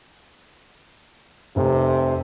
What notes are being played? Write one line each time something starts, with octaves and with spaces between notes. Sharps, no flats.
F1 C3